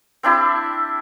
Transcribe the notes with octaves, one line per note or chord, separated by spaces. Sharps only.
C4 D4 E4 G4